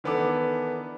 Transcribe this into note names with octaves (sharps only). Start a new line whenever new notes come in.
D#3 E3 B3 D4 A4 D6